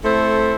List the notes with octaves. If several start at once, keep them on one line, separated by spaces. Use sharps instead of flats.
A3 C4 E4 A4 C5